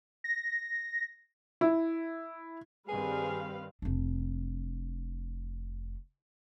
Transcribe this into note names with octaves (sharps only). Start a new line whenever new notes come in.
A#6
E4
G2 D#3 G3 C4 G#4 B4 F5
F1 D4